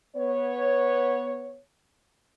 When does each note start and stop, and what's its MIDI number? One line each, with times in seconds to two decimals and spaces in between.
0.16 1.58 59
0.16 1.58 73